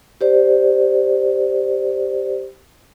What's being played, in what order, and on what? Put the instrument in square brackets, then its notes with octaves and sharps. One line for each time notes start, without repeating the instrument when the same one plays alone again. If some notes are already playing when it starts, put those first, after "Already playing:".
[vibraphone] G4 C5 D5